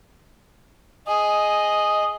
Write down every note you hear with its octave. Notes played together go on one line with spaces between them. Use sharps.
G#4 D#5